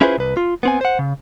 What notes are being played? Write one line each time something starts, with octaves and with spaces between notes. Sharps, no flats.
C#4 E4 F4 G#4 B4 C5
C2 B4
F4
B3 C4 G#5
C5 F#5
C#3